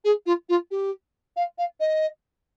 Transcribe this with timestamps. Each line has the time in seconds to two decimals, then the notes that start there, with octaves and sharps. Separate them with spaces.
0.04 G#4
0.26 F4
0.49 F4
0.71 G4
1.36 F5
1.58 F5
1.80 D#5